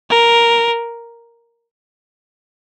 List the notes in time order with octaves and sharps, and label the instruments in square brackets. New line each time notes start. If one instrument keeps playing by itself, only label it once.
[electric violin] A#4